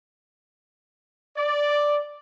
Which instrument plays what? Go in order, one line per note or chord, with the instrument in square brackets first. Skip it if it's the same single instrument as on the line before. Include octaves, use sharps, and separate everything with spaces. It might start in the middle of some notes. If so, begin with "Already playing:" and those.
[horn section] D5